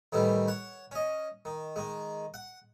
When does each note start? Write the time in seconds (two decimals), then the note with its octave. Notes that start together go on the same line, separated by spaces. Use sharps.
0.13 A2 D#3 E3 G3
0.48 C#5 F#5
0.91 C#4 D#5
1.45 D#3
1.76 D#3 G#3
2.34 F#5